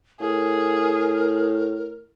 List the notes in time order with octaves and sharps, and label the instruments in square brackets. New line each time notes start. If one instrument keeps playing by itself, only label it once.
[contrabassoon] A2 [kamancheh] G#4 [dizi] A#4